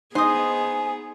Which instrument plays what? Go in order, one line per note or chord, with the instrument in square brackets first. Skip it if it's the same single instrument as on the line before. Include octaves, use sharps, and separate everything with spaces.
[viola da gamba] B3 G#4 [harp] D#4 D#5 [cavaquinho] C5 D#6 [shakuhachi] G#5